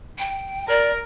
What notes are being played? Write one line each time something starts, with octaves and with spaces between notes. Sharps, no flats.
G5
A#4 D5